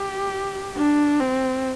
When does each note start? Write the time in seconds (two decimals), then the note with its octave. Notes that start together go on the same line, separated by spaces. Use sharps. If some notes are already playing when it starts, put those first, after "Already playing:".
Already playing: G4
0.77 D4
1.20 C4